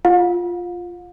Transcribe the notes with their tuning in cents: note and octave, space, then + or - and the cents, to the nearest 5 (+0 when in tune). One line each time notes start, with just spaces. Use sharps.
F4 +0 F5 +45